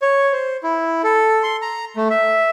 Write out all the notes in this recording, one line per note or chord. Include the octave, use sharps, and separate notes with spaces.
C#5
C5
E4
A4
C6
A#5
A3
E5